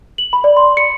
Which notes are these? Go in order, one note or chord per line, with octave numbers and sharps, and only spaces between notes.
F#7
B5
D5
C6
C#7